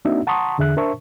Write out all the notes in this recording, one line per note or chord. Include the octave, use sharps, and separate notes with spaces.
A#3 C4 D4 D#4 F#4 E5
F#5 A5 A#5 C6 C#6 D#6
E2 D3 G#4 E5 F#6
D4 A#4 C5 E5 A5 C#6